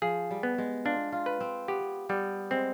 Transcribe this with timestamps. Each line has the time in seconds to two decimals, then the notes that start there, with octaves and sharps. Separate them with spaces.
0.02 F3 G#4
0.31 G3
0.43 B3
0.58 G#3
0.85 D4 F4
1.12 F4
1.26 B4
1.40 C4
1.68 B3 G4
2.09 G3 B3
2.51 G#3 C4